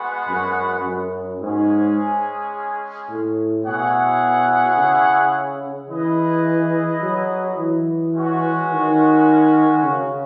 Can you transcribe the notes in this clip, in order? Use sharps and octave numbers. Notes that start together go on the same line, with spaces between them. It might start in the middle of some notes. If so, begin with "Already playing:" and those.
Already playing: G#3 B3 F#4 B4 F#5
F#2
F#2
G#2 G#3 C#4 G#4
A2
B2 E4 G#4 C#5 F#5
C#3
E3 E4 G#4 B4 D#5
F#3
E3
G#3 C#4 F#4
D#3
C#3